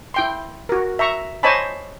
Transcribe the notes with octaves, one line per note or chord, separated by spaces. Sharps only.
E4 G5 C6
F#4 A#4
E5 A#5 C#6
C5 C#5 D#5 G#5 A5 B5